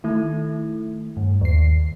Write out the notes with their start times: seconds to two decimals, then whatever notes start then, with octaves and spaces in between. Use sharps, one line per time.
0.04 D#3 A3 E4
1.17 G2
1.41 D#2 C7